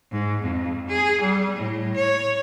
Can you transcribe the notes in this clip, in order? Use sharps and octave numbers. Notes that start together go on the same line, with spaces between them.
G#2
F2
G#4
G3
A2
C#5